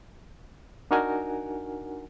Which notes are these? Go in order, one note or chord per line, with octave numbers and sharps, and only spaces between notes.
D4 D#4 F#4 A#4 F#5 G#5